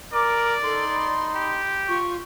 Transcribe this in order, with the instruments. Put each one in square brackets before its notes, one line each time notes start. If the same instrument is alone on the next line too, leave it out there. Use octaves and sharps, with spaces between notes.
[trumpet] A#4 [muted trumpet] D5 [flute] D6
[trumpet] D#4 [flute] A4 [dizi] C6
[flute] B5
[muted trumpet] G4
[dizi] F4 [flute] C#6